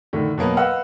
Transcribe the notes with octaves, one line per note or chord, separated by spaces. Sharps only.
A2 D3 D#3
B2 F#3 A#3 B3
B4 D#5 F5 F#5 E6